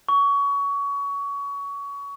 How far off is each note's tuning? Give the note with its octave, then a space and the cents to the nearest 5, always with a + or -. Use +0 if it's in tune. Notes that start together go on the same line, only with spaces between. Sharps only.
C#6 +25